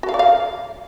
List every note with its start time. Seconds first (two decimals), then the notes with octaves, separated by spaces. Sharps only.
0.03 F#4
0.09 F5
0.14 D5
0.19 F5